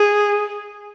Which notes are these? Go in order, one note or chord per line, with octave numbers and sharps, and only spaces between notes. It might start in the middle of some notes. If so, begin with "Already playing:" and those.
Already playing: G#4